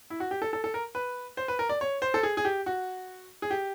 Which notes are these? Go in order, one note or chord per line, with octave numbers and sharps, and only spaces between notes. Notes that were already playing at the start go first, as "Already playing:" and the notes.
E4
F#4
G4
A4
A4
A4
A#4
B4
C5
B4
A#4
D5
C#5
C5
A4
G#4
G#4
G4
F#4
G#4
G4